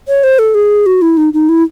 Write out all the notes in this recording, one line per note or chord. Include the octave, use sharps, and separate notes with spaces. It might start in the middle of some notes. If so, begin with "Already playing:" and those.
C#5
C5
A4
G#4
F#4
E4
D#4
D#4
E4